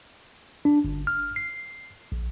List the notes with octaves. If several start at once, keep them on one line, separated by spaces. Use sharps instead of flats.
D4
G1
F6
C7
A#1